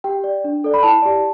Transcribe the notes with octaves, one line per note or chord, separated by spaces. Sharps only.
G4 G5
D5
D4
A4 D5
B5
E4 A5
G4 D5